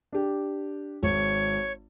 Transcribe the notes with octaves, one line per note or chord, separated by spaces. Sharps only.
D4 G4
G#1 C#5